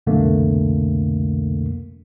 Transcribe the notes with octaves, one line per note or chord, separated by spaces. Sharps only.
C2 F2 B2 D3 A3 A#3